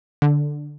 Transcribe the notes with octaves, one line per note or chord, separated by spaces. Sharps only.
D3